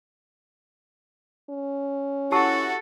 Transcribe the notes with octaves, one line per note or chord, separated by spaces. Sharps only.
C#4
E4 F#4 G4 A4 A5 E6